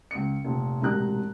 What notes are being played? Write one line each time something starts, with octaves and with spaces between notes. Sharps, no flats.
C#2 C#7
F1 A#2
E1 A2 C3 A#5 F#6